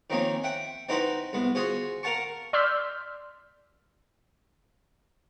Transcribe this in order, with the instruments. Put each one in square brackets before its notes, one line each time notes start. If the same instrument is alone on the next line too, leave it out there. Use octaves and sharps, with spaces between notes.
[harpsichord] D#3 F3 A#3 C4 C#4
E5 F#5 G5
C4 D#4 E4 F#4 B4 C5
C2 B3
F4 F#4 G#4 C5
A#4 F5 F#5 A5 C#6
[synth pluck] D5 C6 E6 F6 G6 B6